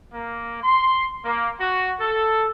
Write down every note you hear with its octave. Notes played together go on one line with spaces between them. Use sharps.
A#3
C6
A#3
F#4
A4